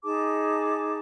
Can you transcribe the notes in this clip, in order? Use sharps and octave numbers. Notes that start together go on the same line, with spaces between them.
D#4 G#4 A5 D6